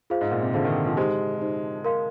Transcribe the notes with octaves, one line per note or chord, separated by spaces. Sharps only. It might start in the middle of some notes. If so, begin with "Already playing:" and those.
F4 G#4 C5 F5
G#2
A#2
C3
D3 F4 G#4 C5 F5
D#3
F3
G#3 D#4 G4 C5
D#4 G4 C5
A#4 F5 C6